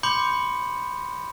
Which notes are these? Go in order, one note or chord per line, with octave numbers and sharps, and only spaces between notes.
B5 C6 D6 G6 C#7